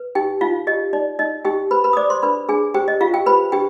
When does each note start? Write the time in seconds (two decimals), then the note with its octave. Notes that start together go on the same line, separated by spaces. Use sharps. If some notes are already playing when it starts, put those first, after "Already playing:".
Already playing: B4
0.15 D#4 G4 G5
0.41 D#4 F4 F5
0.67 G4 D#5
0.93 D#4 D5
1.19 D#4 D#5
1.45 D#4 G4 G5
1.71 B4 C5 B5
1.84 B4 B5
1.93 D#6
1.97 C5 D5 D6
2.10 C5 C6
2.23 D4 B4 B5
2.49 D4 G#4 G#5
2.74 G4 C5 G5
2.88 D#5
3.01 F4 G4 F5
3.14 G4 G5
3.26 B4 C5 B5
3.52 D4 G4 G5